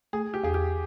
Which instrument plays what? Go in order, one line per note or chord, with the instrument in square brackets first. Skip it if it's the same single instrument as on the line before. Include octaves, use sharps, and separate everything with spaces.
[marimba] A3 [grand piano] G#4
[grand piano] G4
[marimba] E2 [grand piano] G#4
[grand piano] G4